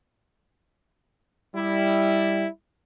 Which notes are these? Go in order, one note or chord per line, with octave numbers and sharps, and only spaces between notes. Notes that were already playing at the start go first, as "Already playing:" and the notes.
G3 E4